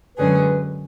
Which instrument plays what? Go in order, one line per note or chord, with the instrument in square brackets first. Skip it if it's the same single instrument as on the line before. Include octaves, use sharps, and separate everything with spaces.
[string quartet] F#2 D3 G#3 C#4 G#4 [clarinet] B4